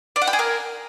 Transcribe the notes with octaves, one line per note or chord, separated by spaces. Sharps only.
D5
F#5
G4
G#4
A#4